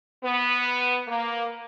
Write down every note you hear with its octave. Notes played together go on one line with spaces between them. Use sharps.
B3
A#3